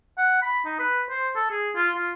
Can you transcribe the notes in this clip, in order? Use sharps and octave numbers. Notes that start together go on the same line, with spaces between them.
F#5
B5
D#4
B4
C5
A4
G#4
F4
F4